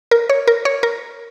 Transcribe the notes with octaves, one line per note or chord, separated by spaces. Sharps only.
A#4
C#5
A#4
C#5
A#4